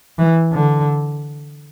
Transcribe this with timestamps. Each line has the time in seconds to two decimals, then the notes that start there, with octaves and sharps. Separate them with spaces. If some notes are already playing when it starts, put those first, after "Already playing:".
0.18 E3
0.53 D3